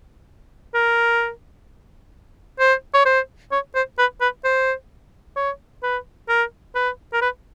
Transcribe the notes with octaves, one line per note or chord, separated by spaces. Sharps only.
A#4
C5
C#5
C5
C#5
C5
B4
B4
C5
C#5
B4
A#4
B4
A#4
B4